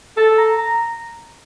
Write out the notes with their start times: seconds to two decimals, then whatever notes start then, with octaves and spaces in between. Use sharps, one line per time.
0.17 A4 A5
0.38 A#5
0.58 A#5